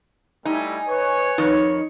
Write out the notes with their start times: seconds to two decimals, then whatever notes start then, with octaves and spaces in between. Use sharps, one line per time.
0.45 G3 A3 D#4 E4 G#5
0.87 B4 C#5
1.38 F2 D#3 D#4